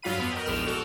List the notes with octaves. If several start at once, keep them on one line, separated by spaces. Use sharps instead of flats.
G2 F#3 F4 F5 B5 D#7
F2 B3
A#4 D#5 G5
A#1 E2 G#2 G5 F6 E7
F#4 A4